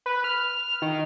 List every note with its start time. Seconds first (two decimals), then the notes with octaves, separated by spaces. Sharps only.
0.06 B4
0.24 F6
0.82 D#3